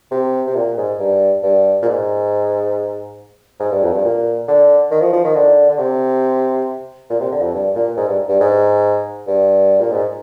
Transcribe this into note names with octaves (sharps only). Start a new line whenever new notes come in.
C3
C3
A#2
G#2
G2
G2
A#2
G#2
G#2
G2
F2
G2
A#2
D3
D#3
F3
F3
D#3
D3
D3
C3
A#2
C3
D3
F2
G2
A#2
G#2
G2
G2
G#2
G2
A#2
G#2